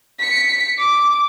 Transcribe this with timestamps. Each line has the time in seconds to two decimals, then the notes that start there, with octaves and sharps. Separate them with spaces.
0.19 B6 C#7
0.78 D6